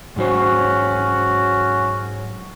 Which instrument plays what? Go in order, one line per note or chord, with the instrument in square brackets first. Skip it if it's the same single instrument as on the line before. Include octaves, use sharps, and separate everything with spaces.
[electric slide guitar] G#2 F#3 C5 [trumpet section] C#4 F#4